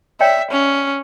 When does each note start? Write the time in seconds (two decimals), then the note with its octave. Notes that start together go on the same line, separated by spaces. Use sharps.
0.21 C#5 D5 E5 G5
0.51 C#4